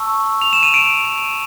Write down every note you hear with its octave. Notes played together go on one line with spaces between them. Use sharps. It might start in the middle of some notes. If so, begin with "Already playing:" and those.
Already playing: A5 C#6 E6
F7
E7
D#7
D7